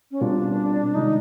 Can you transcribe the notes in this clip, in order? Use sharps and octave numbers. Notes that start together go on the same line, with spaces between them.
C#4
B2 G3 C4 D4 F4 A#4
C3 D#3 G#3 D#4